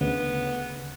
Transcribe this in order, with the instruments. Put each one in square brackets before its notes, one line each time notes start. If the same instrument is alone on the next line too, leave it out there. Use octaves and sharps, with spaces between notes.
[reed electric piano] D2 C#3 [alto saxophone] B3